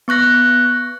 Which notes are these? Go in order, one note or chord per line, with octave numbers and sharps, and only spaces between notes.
B3 C#6 F#6 A#6